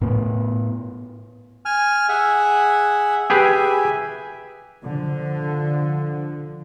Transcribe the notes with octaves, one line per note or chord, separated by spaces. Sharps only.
A2 B3
G#5 F6
G#4 E5 F#5
G4 G#4 B4 E5 G#5
D3 F3